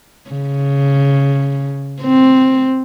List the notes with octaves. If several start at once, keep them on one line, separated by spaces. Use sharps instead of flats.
C#3
C4